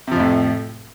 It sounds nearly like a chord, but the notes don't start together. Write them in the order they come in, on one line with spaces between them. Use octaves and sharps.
C3 F3 F2 A2